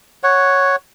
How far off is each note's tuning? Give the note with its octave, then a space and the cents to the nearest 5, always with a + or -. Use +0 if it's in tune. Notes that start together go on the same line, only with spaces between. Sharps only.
C#5 +0 F#5 +0